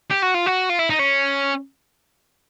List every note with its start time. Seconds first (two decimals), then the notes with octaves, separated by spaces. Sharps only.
0.10 G4
0.22 F#4
0.34 F4
0.46 F#4
0.70 F4
0.79 E4
0.90 D#4
0.99 C#4